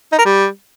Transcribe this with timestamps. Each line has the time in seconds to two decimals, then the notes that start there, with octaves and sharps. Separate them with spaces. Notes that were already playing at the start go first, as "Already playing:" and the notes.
0.12 D#4
0.19 A#4
0.25 G3